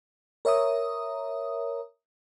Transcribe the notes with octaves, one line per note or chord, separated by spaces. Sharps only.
A#4 C#5 E5 A#5 D#6